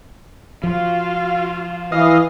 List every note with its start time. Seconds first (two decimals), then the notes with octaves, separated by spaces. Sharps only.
0.64 F3 F4 F#4 F5
1.92 E3 D#5 F5